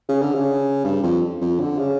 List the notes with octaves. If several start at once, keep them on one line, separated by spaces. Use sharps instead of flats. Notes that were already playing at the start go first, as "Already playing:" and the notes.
C#3
D3
C#3
G2
F2
F2
D3
C#3